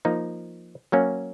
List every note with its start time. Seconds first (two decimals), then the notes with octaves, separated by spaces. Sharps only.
0.05 F3 A#3 D#4
0.92 F#3 A#3 C#4